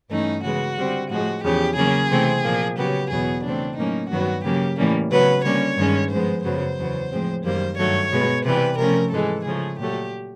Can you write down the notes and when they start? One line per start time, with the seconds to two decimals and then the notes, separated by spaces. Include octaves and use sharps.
0.10 G2 E3 A3 C#4 D#4
0.44 C#3 E3 G#3 B3 F#4
0.77 D3 G3 C4
1.10 A2 F3 G#3 F#4
1.44 E2 C#3 F3 G4
1.77 C#3 F#3 A#3 C#4 G#4
2.11 C3 E3 A3 C4
2.44 A#2 F3 A#3
2.78 C#3 F#3 B3 G4
3.11 E2 B2 F#3 B3 G#4
3.44 C#3 E3 A3 C4 D4
3.77 A2 F#3 A#3 C#4 D#4
4.11 G2 D#3 F#3 B3 F#4
4.44 C#3 F#3 A#3 C#4 G4
4.78 A2 E3 G3 A#3 C#4
5.12 C#3 F#3 B3 B4
5.45 D3 G3 A#3 C#4 C#5
5.78 G2 D#3 G#3 C#4
6.12 G#2 F3 G#3 B3 C5
6.45 F#2 C#3 F#3 B3 C5
6.78 E2 C#3 F#3 B3
7.12 A2 F3 G#3 C4
7.45 F#2 D#3 G3 A#3 C5
7.79 G2 D#3 F#3 A3 C#5
8.12 B2 G#3 B3
8.45 C3 E3 G3 B4
8.79 C3 F3 A3 C#4 A#4
9.12 G#2 E3 G#3 A4
9.45 C#3 F3 A3 G#4
9.79 A#2 F#3 A3 G4